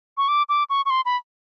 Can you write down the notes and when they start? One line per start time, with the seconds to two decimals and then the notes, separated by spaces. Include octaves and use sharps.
0.17 C#6
0.28 D6
0.49 D6
0.70 C#6
0.86 C#6
0.90 C6
1.06 B5